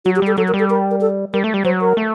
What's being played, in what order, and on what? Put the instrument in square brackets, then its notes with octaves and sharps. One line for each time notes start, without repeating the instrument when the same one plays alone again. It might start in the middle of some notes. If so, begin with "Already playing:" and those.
[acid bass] F#3 [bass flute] F#4
[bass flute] G4
[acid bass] G3 [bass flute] A4
[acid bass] F#3 [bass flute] A4
[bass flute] A#4
[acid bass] G3
[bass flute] A4
A#4
A#4
A4
[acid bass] G3 [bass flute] A#4
[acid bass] A3
G3
[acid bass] F#3 [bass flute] C5
[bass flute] A#4
[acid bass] A3